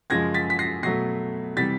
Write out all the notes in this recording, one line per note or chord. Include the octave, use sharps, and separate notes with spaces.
F#2 C#3 F3 G#3 G#6 A#6
A6 B6
B6
A#6 C7
B2 F#3 A3 A#6 C7
C3 E3 G3 A6 B6